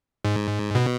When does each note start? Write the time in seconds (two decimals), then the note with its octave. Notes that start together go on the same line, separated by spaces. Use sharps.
0.25 G#2
0.75 B2